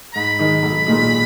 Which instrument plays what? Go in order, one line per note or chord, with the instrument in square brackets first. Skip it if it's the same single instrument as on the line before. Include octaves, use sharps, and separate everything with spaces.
[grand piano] G#2 [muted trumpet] B5
[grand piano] D#3 G#3 D#4
B1
A#2 G#3 D#4